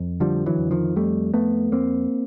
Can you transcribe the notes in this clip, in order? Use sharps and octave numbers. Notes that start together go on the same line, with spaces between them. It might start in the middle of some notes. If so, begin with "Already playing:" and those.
Already playing: F2
D3 F3 G3
E3 F#3
F2
D#3 F3
F2 G3 A3
F2 A3 B3
F2 A#3 C4